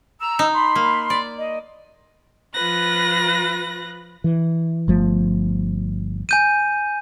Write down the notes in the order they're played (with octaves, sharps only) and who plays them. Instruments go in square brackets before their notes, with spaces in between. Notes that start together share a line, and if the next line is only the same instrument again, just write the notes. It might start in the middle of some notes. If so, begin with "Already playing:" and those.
[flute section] A#5 E6
[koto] D#4
[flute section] B5 C6
[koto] A#3
D5
[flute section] D#5
[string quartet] F3 F4 B4 F#6 A#6
[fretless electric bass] E3
G1 F3 A3
[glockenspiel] G#5 G6 D#7